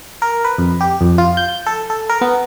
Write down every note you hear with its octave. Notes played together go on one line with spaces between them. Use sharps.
A#4
B4
F2
G4
F2
F4
G6
A4
A4
A#4
B3